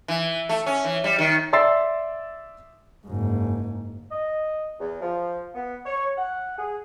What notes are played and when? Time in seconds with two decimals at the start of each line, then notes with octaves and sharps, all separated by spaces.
0.08 E3
0.49 A3
0.66 C#4
0.85 E3
1.04 G3
1.18 D#3
1.53 D5 E5 C6 E6 A6 C7
3.06 F#1 G#2
4.11 D#5
4.80 E2
5.02 F3
5.54 B3
5.85 C#5
6.17 F#5
6.58 G#4